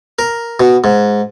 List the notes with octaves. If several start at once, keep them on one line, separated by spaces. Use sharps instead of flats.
A#4
B2
G#2